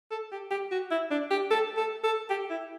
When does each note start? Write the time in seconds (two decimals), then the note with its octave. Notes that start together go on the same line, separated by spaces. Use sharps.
0.11 A4
0.32 G4
0.51 G4
0.71 F#4
0.91 E4
1.11 D4
1.31 G4
1.51 A4
1.77 A4
2.04 A4
2.30 G4
2.50 E4